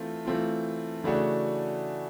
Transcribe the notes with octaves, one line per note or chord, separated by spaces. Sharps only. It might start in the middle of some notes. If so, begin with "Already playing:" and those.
Already playing: E3 A3 C4 F4
E3 A3 C4 F4
C#3 E3 A3 D4 F#4